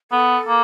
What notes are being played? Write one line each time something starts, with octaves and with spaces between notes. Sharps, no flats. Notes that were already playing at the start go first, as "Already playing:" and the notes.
B3 A4
A#3